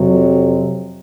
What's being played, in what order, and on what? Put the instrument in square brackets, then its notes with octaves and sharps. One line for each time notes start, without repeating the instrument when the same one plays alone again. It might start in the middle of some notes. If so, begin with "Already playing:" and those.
Already playing: [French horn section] F2 C3 F#3